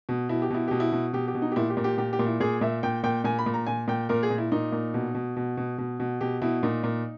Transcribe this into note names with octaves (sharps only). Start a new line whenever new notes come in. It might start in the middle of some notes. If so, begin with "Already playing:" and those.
B2
B2 E4
G4
B2 E4
B2 G4
E4
B2
B2 G4
G4
B2
D#4
G4
A#2 E4
G4
A#2
G4
A#2 G4
G4
A#2
E4
A#2 G#4
A#2 E5
A#2 G5
A#2 G5
A#2 G#5
B5
A#2
A#5
A#2 G#5
A#2 G5
A#2 A#4
G#4
A#2
E4
A#2 D#4
A#2
B2
B2
B2
B2
B2
B2
B2 G4
B2 E4
A#2 D#4
A#2